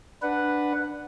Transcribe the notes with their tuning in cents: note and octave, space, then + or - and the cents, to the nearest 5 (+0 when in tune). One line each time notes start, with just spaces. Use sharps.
D4 +10 B4 +0 F#5 +0